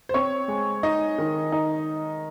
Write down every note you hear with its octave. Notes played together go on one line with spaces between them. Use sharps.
C5
C4 C#5
G#3
D#4 D#5
D#3
D#4